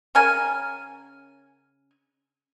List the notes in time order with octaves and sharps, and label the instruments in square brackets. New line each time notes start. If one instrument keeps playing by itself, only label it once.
[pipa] C#3 C#4 A#4 G#5